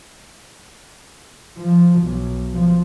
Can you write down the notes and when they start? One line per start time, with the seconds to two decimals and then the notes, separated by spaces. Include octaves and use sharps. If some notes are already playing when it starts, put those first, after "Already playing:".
1.59 F3
2.01 B1
2.53 F3